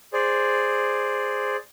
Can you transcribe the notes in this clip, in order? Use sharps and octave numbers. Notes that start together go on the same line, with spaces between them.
G#4 C5 D5